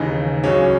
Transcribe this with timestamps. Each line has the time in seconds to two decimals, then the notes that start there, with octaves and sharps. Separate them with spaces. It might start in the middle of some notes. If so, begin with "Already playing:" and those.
Already playing: D#2 C#3 E3 D#4
0.44 C#2 C#3 F#3 C#4